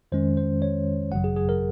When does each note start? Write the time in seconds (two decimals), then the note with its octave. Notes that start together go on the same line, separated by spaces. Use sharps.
0.12 F2 D#3 G#3 C#4 C5
0.37 C5
0.62 C#5
1.12 G#1 F#2 C#3 F#3 F#5
1.24 G#4
1.36 G#4
1.49 A#4